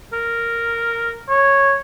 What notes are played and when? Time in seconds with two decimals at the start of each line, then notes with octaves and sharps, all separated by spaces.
0.13 A#4
1.29 C#5